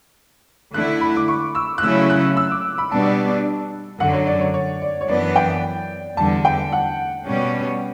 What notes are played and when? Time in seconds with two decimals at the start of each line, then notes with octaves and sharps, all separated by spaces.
0.74 D3 A3 E4 F#6
1.01 B5
1.16 D6
1.28 C#6
1.55 E6
1.78 F#6
1.83 C#3 F#3 A3 C#4 E4 E6
2.10 F#6
2.37 E6
2.51 D6
2.78 B5
2.91 B2 G3 B3 D4 A5
4.00 F#2 D3 F#3 F#5
4.13 C#5
4.27 D5
4.41 C#5
4.54 C#5
4.82 D5
5.01 C#5
5.09 F#2 E3 B3 D4 D5
5.36 G5
6.17 E2 D3 G3 A5
6.45 G5
6.72 F#5
7.26 B2 G3 C#4